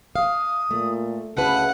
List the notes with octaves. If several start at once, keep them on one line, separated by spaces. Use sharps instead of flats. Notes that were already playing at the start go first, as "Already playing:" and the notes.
F5 D#6
A#2 A3
D2 C#3 E4 B4 F#5 A5